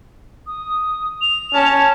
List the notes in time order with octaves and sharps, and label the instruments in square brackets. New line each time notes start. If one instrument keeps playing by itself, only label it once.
[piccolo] D#6
F7
[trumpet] C#4 [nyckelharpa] A5